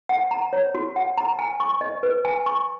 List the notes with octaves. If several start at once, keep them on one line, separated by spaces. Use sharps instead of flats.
F#5
A#5
C#5
F#4
F#5
A#5
G#5
C#6
D#5
B4
G#5
C#6